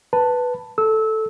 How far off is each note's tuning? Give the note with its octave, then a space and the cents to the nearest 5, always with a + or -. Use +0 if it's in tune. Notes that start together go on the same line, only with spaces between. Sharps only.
B4 +0 A5 +10
A4 +0 E6 -20